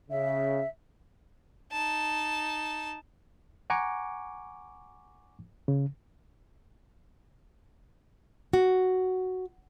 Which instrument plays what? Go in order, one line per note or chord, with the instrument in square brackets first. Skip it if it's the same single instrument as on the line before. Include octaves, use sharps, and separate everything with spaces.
[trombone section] C#3 [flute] E5
[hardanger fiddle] D#4 A5
[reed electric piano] F#5 G#5 A#5 C#6 D6
C#3
[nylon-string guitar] F#4